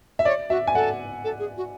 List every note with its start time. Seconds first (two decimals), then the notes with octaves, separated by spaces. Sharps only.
0.19 E5
0.25 C#5 D5
0.50 F#4 E5
0.67 G#5
0.75 A4 F#5
1.24 A4
1.39 G#4
1.57 F#4